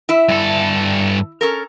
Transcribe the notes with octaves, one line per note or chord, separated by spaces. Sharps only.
E4 E5
G2 A4
C#4 A4 A#4